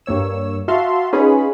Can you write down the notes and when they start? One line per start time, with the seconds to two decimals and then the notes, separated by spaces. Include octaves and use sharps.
0.06 G2 A#3 C#5 E6
0.68 F#4 E5 F5 A5 C6
1.13 C#4 D#4 F4 G#4 B4 B5